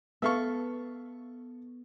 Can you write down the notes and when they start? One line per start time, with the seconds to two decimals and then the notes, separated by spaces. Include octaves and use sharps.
0.22 B3 A4 E5 F5 C#6